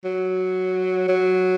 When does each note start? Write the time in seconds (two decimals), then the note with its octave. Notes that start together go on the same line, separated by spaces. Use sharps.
0.05 F#3
1.08 F#3